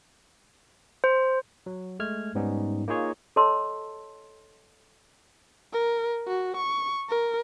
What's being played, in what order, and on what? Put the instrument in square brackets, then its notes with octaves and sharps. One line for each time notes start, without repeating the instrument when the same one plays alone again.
[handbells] C5
[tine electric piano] F#3
G#3 A3 F6 G#6
G#2 G3 B3 C#4 D#4
A#3 D#4 F4 G#4 C#5
[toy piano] A4 C#5 D#5 A5 C6 E6
[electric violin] A#4
F#4
C#6
A#4